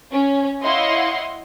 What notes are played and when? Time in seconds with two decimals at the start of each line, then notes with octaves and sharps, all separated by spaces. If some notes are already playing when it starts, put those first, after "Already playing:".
0.12 C#4
0.63 E4 C#5 D#5 F5 F#5 C6